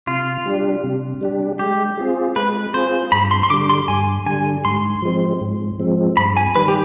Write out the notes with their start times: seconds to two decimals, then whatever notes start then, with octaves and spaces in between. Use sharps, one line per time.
0.07 C3 F4
0.46 G3 D4 G4
0.84 C3
1.21 G3 D4 G4
1.59 G#3 G4
1.98 C4 F4 G#4
2.36 G#3 B4
2.74 C4 F4 G#4 C5
3.12 G2 B5
3.31 C6
3.43 C6
3.50 D3 G3 D6
3.69 C6
3.88 G2 G#5
4.26 D3 G3 G#5
4.65 G#2 C6
5.02 F3 G#3 C4
5.41 G#2
5.79 F3 G#3 C4
6.17 G2 B5
6.37 G#5
6.55 D#3 G3 B4
6.68 G4